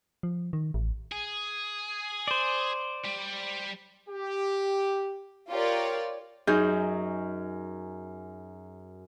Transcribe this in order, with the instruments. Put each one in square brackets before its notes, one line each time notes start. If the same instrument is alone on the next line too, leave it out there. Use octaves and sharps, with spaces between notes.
[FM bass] F3
D#3
A1
[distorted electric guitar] G#4
[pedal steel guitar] C5 D5
[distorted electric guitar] G3
[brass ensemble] G4
[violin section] F4 G4 A#4 C#5 D5
[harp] F#2 D#4 G#4 G6